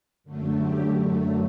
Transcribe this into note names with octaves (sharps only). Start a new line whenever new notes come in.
F#2 D3 F#3 A3
G4